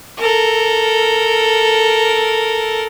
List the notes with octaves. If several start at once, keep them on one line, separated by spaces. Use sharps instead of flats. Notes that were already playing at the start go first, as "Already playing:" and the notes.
A4 A#4